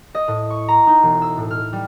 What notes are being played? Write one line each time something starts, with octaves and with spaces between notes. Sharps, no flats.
D#5
A2
C#6
A#5
D#4
E1
E6
A2
F6
G3